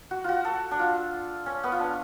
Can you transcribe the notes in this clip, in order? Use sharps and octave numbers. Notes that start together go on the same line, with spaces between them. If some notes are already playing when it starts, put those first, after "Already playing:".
F#4
F4 F#4
A4
D4
F4
C#4
B3
F4
D4